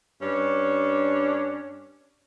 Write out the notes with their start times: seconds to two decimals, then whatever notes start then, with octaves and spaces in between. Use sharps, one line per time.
0.22 G2 C#4 D4